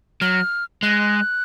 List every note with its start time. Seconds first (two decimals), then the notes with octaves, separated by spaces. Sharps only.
0.21 F#3 F6
0.83 G#3 F#6